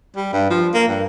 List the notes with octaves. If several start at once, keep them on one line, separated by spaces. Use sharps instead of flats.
G3
G2
F3
A#3
G2